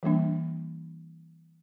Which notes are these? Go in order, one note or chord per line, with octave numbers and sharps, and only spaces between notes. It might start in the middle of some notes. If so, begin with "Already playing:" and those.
E3 G3 A#3 D4